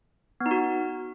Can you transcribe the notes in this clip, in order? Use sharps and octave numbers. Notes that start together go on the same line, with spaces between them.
B3
D#4
F#4